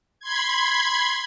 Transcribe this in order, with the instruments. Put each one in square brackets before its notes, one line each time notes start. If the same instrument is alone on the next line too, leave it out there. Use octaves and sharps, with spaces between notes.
[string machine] B5 C6 G#6